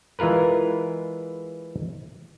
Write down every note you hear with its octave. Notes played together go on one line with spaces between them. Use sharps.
E3 G#3 F4 A#4 B4